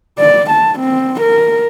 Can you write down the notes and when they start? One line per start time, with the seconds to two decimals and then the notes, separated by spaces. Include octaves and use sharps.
0.19 D5
0.51 A5
0.80 C4
1.21 A#4